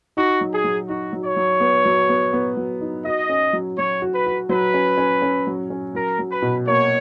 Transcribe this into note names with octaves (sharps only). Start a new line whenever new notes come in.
D#4 F#4
F#3
G#4
F#3
D#4 F#4
F#3
C#5
F#3
B3
F#3
B3
B3
F#3
D#4
F#4 D#5
C#4
F#3
F#3 C#5
F#4
B4
F#4
F#3 B4
C#4
C#4
C#4
F#3
C#4
F#3 A#4
F#3
B4
B2
A#3 C#5